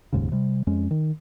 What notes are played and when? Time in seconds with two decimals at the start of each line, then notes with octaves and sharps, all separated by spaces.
0.13 F1 D#2 G#2 C#3
0.32 C3 G3
0.67 F2 G#3 C#4
0.91 D#3